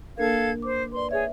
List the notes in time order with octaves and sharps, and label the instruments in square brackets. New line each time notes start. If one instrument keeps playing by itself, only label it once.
[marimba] A#3 D4 A#4 [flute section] A4 F5 G#6
[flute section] C5 [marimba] D6
[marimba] B4 D5 [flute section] C6
[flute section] G#4 C#5 [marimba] E5